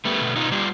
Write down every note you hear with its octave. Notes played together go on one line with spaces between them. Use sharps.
G3 A3 B3
B2
B2 D#4 F4
G3 F4 G4